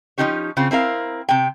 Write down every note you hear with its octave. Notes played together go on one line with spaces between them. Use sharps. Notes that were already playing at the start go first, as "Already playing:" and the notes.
F3 A3 C#4 D#4 G4 C#5
C#3 C4 F4
C4 E4 A#4 F5
C3 G5